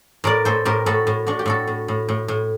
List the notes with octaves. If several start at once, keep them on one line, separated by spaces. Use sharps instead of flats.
A2 A#4 D5
A2 A4 C5
A2 G4 A#4
A2 F#4 A4
A2
A2 D4 F#4
G4
A2 F#4 A4
A2
A2
A2
A2